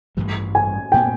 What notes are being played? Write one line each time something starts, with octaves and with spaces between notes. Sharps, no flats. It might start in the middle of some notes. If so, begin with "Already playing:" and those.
A1 G2 E3 G3
G#5
A#2 F#3 B3 G5